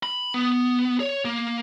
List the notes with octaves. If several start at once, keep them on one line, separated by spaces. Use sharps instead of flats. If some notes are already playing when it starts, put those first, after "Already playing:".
B5
B3
C#5
A#3